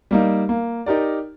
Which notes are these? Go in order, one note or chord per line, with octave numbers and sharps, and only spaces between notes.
G3 A#3 D#4
A#3
D#4 G4 A#4 D5